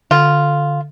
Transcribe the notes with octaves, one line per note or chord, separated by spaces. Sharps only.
D3 F4